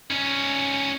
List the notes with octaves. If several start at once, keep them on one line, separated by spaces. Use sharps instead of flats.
C#4 D#4